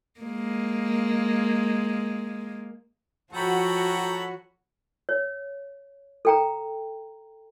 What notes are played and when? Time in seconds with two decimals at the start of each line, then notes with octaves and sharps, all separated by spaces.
0.20 G#3 A#3
3.33 F3 F#4 A4 C#5 G5 A#5 B5
5.09 C#5
6.25 A4 G5 A#5